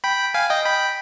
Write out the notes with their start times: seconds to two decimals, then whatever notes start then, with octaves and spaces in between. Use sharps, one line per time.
0.04 G5 B5
0.34 F5 G#5
0.50 D#5 G5
0.65 G5 B5